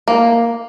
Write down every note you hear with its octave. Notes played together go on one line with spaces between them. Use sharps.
A#3